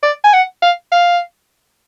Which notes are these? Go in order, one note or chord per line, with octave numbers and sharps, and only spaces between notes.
D5
G#5
F#5
F5
F5